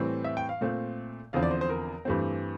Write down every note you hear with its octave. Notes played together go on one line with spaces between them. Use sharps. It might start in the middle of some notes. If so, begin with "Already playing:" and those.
Already playing: A2 E3 G3 C4
E5
G5
F5
A#2 A3 C4
E2 D3 F3 C4 F5
D5
C5
C5
A#4
G2 E3 A3 C4